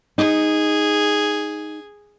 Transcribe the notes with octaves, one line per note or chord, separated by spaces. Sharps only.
D#4 G#4